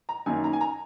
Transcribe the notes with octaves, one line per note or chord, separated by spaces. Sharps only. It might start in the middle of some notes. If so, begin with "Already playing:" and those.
A#5
F#2 D#3 A#3 G#5
A#5
G#5
A#5